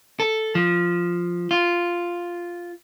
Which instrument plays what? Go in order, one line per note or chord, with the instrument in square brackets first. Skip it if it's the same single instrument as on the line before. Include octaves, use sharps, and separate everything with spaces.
[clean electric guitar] A4
F3
F4